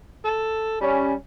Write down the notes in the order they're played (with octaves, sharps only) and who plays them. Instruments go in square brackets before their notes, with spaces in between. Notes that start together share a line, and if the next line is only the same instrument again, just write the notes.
[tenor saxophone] A4
[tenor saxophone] G3 [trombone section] C#4